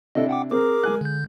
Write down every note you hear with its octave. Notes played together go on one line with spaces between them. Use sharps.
C3 D4 E4 A4 D#5
F#5 G5 D6
C4 G#4 A#4 D6
G#3 G#5 F#6
D3 G6